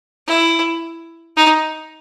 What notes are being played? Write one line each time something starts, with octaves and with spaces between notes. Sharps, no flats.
E4
D#4